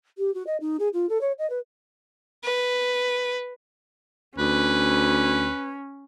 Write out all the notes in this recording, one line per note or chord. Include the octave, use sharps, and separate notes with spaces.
G4
F#4
D#5
D#4
G#4
F4
A4
C#5
D#5
B4
B4
D2 C#4 B4